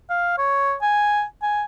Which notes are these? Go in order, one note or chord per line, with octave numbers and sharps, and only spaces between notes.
F5
C#5
G#5
G#5